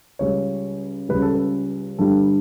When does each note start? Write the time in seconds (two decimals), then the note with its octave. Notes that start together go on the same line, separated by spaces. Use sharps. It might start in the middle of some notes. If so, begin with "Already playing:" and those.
0.19 C#2 C#3 G3 C#5
1.09 C#2 C#3 G3 B4
1.22 A4
1.34 B4
1.98 G2 D3 G3 A4